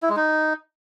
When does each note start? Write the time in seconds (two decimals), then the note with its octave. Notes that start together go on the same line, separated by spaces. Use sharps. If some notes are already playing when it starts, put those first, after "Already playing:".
0.02 E4
0.09 G#3
0.16 D#4